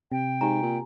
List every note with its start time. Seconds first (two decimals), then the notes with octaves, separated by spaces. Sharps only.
0.12 C3 G5
0.41 G#2 G4 G#5 A#5
0.63 A#2